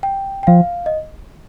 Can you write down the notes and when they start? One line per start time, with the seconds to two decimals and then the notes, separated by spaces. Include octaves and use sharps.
0.03 G5
0.43 G5
0.47 F3 F5
0.86 D#5